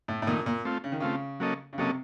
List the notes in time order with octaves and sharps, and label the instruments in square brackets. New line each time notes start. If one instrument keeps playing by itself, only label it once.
[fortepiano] A2
A2
[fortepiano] A#2 [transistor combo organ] D#3 A3 D#4
[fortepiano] A#2
[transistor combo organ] A3 C4 F4
[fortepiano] C#3
D#3
[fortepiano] C#3 [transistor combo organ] A3 C4 F4
[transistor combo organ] F#3 A#3 C#4 A4 D#5
[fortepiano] C#3
[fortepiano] C3 [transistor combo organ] F#3 A#3 C#4 A4 D#5